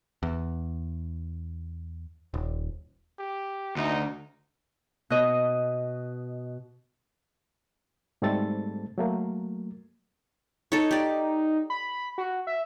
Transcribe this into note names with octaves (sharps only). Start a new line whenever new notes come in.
E2
D#1
G4
D2 D#4
B2 D#5
G#2 G3 A3 C4 A4 A6
F#3 A3 A#3
D#4 A4 C#5
G4 D5
B5
F#4
E5